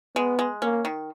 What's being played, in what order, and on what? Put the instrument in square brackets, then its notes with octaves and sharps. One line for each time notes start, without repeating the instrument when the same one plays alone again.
[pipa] G#3 [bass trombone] B3
[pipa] G#3
[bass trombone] A#3 [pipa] C#4
[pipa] D#3